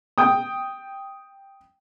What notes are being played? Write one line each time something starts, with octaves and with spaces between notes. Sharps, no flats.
G5 D#6